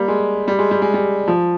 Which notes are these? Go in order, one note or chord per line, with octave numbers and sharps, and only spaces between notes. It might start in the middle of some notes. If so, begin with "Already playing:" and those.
Already playing: G3 A#3
G#3
G3
G#3
G3
G#3
G3
F3